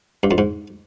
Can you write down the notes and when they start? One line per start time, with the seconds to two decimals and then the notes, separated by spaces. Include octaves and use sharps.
0.23 G2
0.31 F2
0.38 G#2